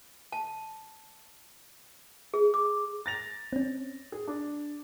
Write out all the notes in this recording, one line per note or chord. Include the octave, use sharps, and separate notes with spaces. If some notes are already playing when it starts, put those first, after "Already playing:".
A5
G#4
D6
A6 A#6 F7
C4 C#4
G#4
D4